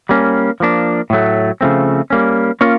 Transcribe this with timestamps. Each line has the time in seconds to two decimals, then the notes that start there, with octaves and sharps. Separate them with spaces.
0.09 G3 A#3 C#4
0.60 F3 A#3 D4
1.10 A2 F#3 A3
1.61 C#3 F3 A3 C4
2.10 G3 A#3 C#4
2.61 A#3 C#4 F4 A#4 C#5